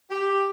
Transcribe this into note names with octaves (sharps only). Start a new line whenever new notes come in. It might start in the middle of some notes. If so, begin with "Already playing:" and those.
G4